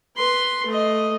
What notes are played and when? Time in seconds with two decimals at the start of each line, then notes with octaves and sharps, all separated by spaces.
0.17 B4 C6
0.66 A3 D#5